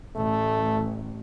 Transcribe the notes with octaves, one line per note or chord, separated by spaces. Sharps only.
A1 A3